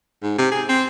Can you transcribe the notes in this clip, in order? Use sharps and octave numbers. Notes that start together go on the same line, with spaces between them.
G#2
C3
G#4
C4